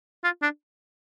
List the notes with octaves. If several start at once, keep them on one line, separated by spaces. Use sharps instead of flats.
F4
D4